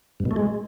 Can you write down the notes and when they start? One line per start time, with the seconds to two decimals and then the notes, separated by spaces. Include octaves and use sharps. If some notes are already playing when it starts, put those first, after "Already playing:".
0.20 G2
0.25 B2
0.31 A3
0.36 G#3